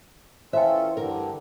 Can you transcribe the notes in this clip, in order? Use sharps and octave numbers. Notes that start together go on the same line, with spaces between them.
E3 C#4 F4 A4 C5 E5 G5
G2 D3 A#4